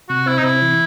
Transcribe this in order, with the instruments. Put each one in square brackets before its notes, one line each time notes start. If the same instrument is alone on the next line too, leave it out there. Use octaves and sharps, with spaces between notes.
[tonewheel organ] C3 [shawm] F#4
[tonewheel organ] C4 [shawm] E4
[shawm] D#4
[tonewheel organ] C3 [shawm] E4
[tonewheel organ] E3